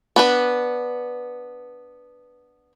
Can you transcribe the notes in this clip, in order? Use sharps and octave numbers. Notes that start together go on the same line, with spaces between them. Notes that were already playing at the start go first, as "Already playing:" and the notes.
B3 D4 B4